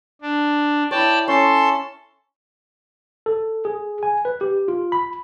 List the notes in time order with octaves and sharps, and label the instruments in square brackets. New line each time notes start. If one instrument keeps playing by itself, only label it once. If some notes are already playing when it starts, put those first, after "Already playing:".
[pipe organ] D4
[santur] E4 C#5 [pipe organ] D5 G5 A5
[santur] C#4 [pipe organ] A4 C6
[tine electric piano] A4
G#4
G#5
B4
G4
F4
B5